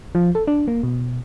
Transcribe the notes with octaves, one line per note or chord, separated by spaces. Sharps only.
F3
A4
D4
A#3
B2